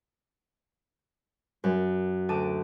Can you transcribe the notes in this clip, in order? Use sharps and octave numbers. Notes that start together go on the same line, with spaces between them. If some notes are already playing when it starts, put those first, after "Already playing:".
F#2
D2 A5 D6 D7 D#7